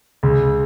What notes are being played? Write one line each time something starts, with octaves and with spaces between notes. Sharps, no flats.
C#2 C#3